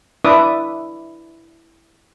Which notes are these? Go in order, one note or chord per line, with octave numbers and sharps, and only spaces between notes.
D4 E4 B4 E5 D6 D#6